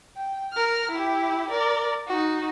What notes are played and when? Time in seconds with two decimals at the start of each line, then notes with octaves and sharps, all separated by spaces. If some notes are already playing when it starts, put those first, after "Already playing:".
0.17 G5
0.53 A#4 F6
0.91 E4 G4
1.50 A#4 D5
2.08 D#4 F#4